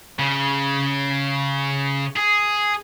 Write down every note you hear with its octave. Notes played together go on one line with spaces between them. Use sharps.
C#3
G#4